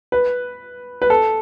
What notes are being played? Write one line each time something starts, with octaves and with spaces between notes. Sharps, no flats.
B4
B4
A4